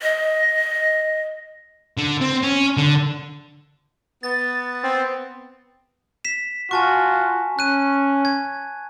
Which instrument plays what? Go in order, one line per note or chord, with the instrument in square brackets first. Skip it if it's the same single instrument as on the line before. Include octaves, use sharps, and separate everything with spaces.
[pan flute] D#5
[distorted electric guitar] D3
C4
C#4
D3
[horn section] B3 [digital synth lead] A6
[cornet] C4
[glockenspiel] B6 E7
[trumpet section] F4 F#4 [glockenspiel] G#5 A5 C#6
[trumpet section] C#4 [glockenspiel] F#6 D#7
[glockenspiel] G#6